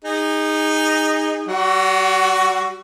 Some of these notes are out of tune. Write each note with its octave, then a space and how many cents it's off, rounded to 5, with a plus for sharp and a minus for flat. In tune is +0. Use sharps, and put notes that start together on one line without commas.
D#4 +0 G#4 -30
G3 -40 F#4 +5 F#5 +30